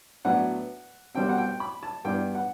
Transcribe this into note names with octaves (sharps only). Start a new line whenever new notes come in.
A2 F#3 B3 D4 F#5
C2 B2 G3 C4 G5
F#5
G5
B5
A5
G2 E3 B3 D4 G5
F#5